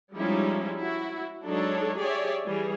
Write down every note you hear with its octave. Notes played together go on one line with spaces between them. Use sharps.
F3 G3 G#3 C#4 D#4 E4
E4 F#4
F#3 G#3 D4 D#4 A4 C#5
G4 G#4 C#5 D5 E5
E3 G3 G#4